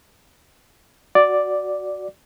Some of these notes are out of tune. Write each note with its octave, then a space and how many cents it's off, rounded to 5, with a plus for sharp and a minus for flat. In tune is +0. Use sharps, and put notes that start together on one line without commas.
F#4 +0 D5 +0